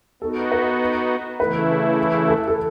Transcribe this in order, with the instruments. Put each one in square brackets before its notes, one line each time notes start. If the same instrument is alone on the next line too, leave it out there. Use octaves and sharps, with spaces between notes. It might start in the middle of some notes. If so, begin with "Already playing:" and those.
[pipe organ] B3 D#4 F#4 [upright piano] A4
[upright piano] B4
[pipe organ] C#3 E3 A3 E4 [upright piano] B4
[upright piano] A4
A4